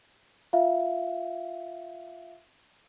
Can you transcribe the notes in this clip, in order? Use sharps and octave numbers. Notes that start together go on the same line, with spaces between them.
F4 E5 F5